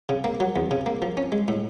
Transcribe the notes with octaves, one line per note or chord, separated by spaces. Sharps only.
C#3
A#3
F#3
E2
C#3
A#3
F3
C#4
G#3
A2